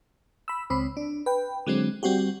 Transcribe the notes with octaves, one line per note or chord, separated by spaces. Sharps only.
B5 E6
C#2 C4 B5
D4
B4 G5
D3 F#3 G#3 C4
G3 C4 F#4 G4